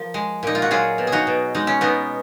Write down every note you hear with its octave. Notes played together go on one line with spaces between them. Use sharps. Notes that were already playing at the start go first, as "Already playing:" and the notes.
Already playing: F3 A#4
G#3
A#2 D#4
F4
F#4
F#3 F4 G#4
B2
G#4
D#4 F#4
B2
G#3 D#4
C#4
B2 B3 D#4